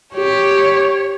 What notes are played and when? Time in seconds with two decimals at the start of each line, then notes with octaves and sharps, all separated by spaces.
0.15 G4 C#5